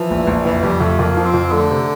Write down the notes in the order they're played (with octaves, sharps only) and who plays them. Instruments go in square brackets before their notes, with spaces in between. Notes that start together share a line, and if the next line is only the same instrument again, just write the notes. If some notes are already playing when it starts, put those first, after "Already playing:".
Already playing: [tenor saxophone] E3 [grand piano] F3
[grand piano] A#1
A#1
[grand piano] F2 [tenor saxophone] E3
[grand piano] F2 [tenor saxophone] G3
[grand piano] F2 [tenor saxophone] A3
[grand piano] F2 [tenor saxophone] A#3
[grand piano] F3
[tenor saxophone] C4
[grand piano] F2
[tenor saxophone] D3 [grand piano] A3
[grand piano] C3